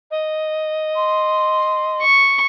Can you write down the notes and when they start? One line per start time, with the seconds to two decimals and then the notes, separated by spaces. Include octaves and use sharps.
0.11 D#5
0.95 C6
2.02 C#6